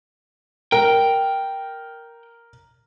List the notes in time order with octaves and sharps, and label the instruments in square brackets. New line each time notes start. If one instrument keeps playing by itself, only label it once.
[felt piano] A#4 [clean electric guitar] G5